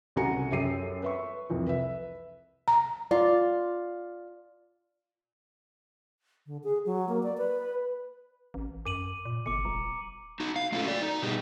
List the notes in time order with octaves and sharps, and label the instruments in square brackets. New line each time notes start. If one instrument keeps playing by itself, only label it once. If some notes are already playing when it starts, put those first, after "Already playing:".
[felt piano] C2 C#3 F#4 G#5 A#5 C#7
F#2 G4 A4 C7 D#7
B4 E5 C#6
C2 F2 E3
B4 E5
[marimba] A#5
[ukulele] F4 [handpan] D5
[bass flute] D3
G#4
F#3
A#3
D5
B4
[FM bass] A1
[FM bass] F#2 [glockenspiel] D6 D#7 F#7
[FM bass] A#2
[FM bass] G1 [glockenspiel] D6 C#7
[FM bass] D#1 [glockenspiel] A#5
[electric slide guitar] D#4 F#4
F5
A3 C#4 E4 F4 G#4 A4
F#4 D5
D#4
B2 G3 B3 D#4 G4 G#4